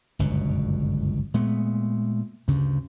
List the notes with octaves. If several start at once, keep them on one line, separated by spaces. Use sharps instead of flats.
G1 C#2 F#2 B2
A#2 G#3 A3 B3
D2 G2 C#3